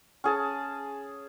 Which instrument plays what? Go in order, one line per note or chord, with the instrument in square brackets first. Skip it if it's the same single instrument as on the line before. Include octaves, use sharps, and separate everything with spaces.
[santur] C#4 G#4 A5